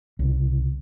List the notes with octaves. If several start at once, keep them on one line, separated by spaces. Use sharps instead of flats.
C2 C#3